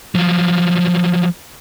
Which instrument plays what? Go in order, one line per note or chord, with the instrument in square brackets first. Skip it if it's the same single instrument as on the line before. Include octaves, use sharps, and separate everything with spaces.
[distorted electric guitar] F3 F#3